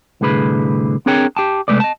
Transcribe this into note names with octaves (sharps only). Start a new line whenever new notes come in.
C2 A2 D3 G#4 B4 B5
C4 D4 G#4 A#4 C#5 G5
G4 G5 A5
C3 G#3 A3 B4 D5
D#5 A5